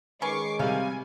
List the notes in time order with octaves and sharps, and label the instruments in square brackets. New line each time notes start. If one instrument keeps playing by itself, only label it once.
[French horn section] D#3 G#3 [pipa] C#4 B4 [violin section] C#6 D6 C7
[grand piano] C3 G3 [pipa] C#5 F5 [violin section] G#5